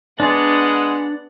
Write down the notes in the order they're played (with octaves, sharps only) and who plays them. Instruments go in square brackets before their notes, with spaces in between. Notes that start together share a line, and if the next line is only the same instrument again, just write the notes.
[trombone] G#3 [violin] B3 F#5 [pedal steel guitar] D4 D5